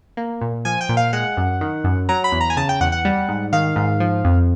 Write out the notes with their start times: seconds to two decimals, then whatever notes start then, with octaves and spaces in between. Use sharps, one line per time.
0.17 A#3
0.41 A#2
0.65 F3 G#5
0.81 G5
0.89 A#2
0.97 F5
1.13 G#3 F#5
1.37 F#2
1.61 D#3
1.84 F#2
2.09 F#3 A#5
2.24 B5
2.32 E2
2.41 A#5
2.50 G#5
2.57 C#3 A5
2.69 G5
2.81 E2 F#5
2.92 F#5
3.05 G3
3.28 G#2
3.53 D#3 F5
3.76 G#2
4.00 F3
4.24 F2